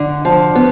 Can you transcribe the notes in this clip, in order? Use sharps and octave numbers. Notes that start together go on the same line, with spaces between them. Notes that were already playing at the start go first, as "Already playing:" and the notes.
Already playing: D3
F3
B3